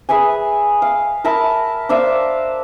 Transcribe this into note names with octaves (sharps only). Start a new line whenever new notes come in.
G#4 B4 E5 G#5
F5
A#4 E5 A5 B5
D4 C5 E5 F5